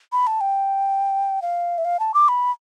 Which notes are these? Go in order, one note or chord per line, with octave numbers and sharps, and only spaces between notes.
B5
A5
G5
F5
E5
F5
A5
D6
B5